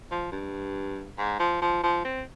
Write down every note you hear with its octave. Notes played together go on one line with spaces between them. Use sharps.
F3
G2
G#2
F3
F3
F3
C4